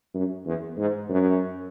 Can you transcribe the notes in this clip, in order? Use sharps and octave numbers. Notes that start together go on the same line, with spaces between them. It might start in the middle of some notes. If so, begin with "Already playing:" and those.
F#2
E2
G#2
F#2